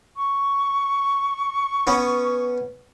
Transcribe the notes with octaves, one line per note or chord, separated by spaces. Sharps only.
C#6
B3 C#4